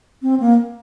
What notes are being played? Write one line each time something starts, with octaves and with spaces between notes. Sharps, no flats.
C4
A#3